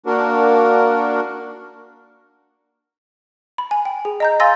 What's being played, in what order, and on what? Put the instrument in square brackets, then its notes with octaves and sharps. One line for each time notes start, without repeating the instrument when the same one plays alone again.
[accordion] A#3 D4 F#4 A#4
[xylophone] B5
G#5
G5
G#4
D#5 A#5 G6
F5 G#5 C6 E6 A6 A#6